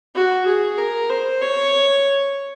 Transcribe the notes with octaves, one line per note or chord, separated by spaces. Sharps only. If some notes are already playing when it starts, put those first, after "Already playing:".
F#4
G#4
A#4
C5
C#5